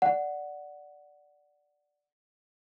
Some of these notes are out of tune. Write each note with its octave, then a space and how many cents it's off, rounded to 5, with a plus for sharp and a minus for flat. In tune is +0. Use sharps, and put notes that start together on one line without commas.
D5 +0 F#5 +0